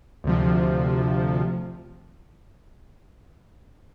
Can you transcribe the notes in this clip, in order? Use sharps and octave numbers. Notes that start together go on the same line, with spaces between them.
D2 C3 F3